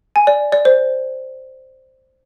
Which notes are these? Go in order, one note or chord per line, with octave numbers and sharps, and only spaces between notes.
G#5
D5
D5
C5